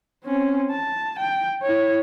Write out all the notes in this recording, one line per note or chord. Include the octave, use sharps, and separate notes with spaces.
C4 C#4
A5
G5
E4 C#5